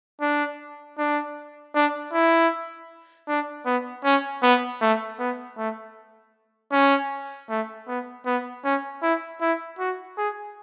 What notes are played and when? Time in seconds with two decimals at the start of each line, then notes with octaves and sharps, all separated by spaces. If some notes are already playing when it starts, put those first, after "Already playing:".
0.21 D4
0.98 D4
1.75 D4
2.13 E4
3.28 D4
3.66 B3
4.05 C#4
4.43 B3
4.81 A3
5.19 B3
5.57 A3
6.72 C#4
7.50 A3
7.88 B3
8.26 B3
8.64 C#4
9.02 E4
9.41 E4
9.79 F#4
10.18 G#4